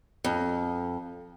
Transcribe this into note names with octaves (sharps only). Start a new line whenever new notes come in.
F2